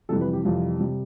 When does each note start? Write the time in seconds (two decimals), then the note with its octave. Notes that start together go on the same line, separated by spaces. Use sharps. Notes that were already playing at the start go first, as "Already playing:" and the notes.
0.09 F2 C3 E3 G3 A4
0.21 B4
0.33 G4
0.45 F2 C3 E3 G3 F4
0.80 C3 G3